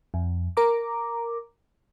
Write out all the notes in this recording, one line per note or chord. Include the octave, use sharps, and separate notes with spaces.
F2
A#4 A#5 D6